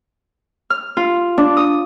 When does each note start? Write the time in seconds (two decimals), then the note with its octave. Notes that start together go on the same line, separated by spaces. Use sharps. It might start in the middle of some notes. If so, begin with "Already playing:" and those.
0.70 F6
0.97 F4
1.38 D4
1.57 D#6